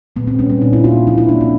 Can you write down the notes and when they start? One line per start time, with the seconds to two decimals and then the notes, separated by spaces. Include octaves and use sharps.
0.16 A#2 B3
0.27 C4
0.39 G3 C#4
0.50 C#4
0.61 A#2 D4
0.73 E4
0.84 A#3 F4
1.07 F3 E4
1.18 E4
1.29 A#3 D4
1.41 C4